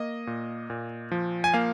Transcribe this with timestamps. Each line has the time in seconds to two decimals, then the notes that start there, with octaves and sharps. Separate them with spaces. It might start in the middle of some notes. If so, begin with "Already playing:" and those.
Already playing: A#3 D#5
0.27 A#2
0.70 A#2
1.11 F3
1.44 G#5
1.54 A#3 F5